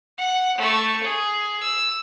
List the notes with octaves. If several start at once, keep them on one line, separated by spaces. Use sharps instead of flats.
F#5
A3 C#6
G#4
E6